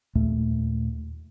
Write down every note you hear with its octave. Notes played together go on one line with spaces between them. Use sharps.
D#2 A#2 A3